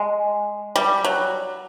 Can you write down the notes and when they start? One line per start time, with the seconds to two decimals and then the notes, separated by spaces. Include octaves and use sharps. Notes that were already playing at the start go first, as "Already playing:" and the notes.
Already playing: G#3
0.76 G3
1.04 F#3